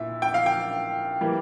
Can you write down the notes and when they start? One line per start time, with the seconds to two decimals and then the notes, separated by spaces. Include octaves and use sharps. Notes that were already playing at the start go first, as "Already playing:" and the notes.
Already playing: A#2 E4 E5
0.22 G5
0.34 F5
0.46 G5
1.21 E3 G3 A#3